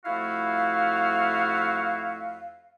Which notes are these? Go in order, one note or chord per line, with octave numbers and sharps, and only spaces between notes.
F2 A3 E4 F#4 E5 F5